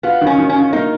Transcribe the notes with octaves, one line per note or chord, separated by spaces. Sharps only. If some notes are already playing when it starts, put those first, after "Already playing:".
B3 F4
D#3
C#4
D#3
C#4
F4
A#3 D#4